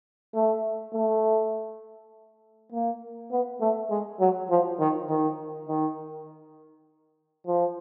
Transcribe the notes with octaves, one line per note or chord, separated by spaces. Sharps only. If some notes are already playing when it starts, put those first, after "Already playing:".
A3
A3
A#3
B3
A3
G#3
F#3
F3
D#3
D#3
D#3
F3